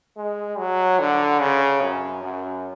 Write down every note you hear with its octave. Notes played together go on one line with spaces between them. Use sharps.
G#3
F#3
D3
C#3
F#2
F#2